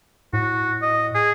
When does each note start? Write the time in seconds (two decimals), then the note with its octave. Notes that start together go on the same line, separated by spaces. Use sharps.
0.33 A2 F#4
0.82 D#5
1.15 G#4